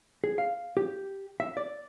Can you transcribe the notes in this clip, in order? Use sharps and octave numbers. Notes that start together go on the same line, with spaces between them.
G#4
F5
G4
E5
D5